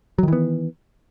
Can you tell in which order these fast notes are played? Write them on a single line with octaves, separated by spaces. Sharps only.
F#3 D#3 E3 B3